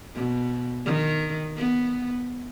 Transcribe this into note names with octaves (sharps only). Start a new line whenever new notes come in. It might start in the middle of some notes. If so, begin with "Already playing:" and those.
B2
D#3
B3